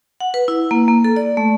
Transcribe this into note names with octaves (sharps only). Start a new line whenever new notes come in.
F#5
B4
E4
A#3
A#3
A4
D5
A3